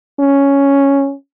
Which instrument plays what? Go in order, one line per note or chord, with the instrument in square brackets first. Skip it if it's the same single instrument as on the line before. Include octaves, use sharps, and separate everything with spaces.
[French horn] C#4